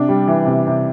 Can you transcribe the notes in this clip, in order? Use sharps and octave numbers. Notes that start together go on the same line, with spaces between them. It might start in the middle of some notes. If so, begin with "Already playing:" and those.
Already playing: C3 D4
G3
E3
C3
C3